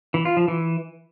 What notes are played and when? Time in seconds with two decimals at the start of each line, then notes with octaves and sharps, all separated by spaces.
0.14 E3
0.25 F4
0.37 F3
0.48 E3